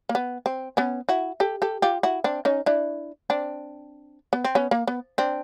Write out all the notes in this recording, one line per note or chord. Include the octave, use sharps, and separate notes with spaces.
A#3
B3
C4
B3 C#4
E4 F#4
G4 A4
G4 A4
F4 G4
E4 F#4
C4 D4
C#4 D#4
D4 E4
C4 D4
B3
C4
B3 C#4
A#3
B3
C4 D4